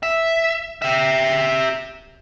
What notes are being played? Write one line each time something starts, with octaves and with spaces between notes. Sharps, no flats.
E5
G4 E5